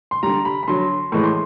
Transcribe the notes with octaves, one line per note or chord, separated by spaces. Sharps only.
C6
D3 G3 A#5
B5
B5
D3 F#3 C6
A2 E3 G#3 C#6
C6